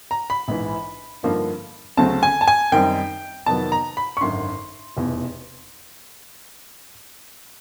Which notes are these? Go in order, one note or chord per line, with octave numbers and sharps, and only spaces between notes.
A#5
B5
A#1 G#2 E3
G2 D3 F3 A#3 D#4
D2 C#3 F#3 A3 C4 A5
G#5
A5
G#5
F#2 D#3 G3 C4 D#4 G5
F2 C3 D#3 F#3 B3 A5
A#5
B5
C#6
G#1 F#2 D3 C6
F1 E2 B2